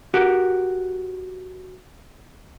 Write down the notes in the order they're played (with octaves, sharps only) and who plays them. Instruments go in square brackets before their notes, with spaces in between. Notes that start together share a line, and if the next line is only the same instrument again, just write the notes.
[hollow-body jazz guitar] F#4 G4 A#4